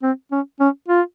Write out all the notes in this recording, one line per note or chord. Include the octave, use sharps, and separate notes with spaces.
C4
C#4
C#4
F4